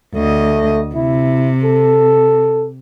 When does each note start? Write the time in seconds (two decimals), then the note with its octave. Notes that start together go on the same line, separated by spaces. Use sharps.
0.14 D2 A3 D#5
0.95 C3 E4
1.64 A4